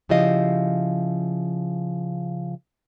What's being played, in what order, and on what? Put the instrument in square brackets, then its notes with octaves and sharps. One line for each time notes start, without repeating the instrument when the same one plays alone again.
[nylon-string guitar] C#3 F3 E4 G4 D#5 F5